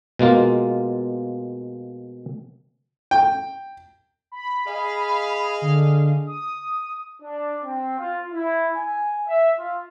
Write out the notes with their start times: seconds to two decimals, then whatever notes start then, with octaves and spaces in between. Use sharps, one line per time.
0.19 B2 G#3 A#3 F4
3.11 G5
4.32 B5
4.67 G#4 D#5 F5
5.62 D3
6.27 D#6
7.22 D4
7.64 C4
7.99 F4
8.33 E4
8.76 G#5
9.28 E5
9.58 F4